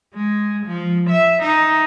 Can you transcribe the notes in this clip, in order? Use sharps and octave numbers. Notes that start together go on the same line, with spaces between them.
G#3
F3
E5
D#4